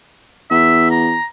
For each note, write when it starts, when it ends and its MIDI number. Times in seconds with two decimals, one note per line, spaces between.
0.50 1.16 40
0.50 0.90 76
0.91 1.25 82